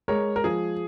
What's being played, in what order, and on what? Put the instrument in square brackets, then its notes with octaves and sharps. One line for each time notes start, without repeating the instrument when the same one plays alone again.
[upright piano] G#3 [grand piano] A#4 C#5
[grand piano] A#4
[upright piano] F3 [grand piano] G#4